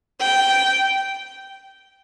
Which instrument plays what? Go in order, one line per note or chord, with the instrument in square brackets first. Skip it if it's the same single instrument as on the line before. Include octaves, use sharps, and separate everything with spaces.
[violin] G5